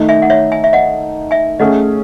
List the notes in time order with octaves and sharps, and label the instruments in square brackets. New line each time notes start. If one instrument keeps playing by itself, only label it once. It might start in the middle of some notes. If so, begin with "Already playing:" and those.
Already playing: [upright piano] D#3 A3 D#4
[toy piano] E5 G#5
F#5
C#5 E5
E5 G#5
E5
D#5 F#5
E5 G#5
[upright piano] A3 C#4 G#4 [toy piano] D#5 F#5